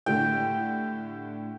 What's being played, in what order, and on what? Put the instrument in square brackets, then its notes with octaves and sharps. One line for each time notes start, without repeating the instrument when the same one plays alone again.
[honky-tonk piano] A2 D3 G4 [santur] G5